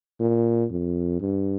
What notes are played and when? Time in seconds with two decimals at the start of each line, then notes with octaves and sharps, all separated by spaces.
0.20 A#2
0.71 F2
1.21 G2